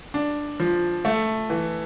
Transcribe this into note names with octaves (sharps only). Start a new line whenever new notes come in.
D4
F3
A3
E3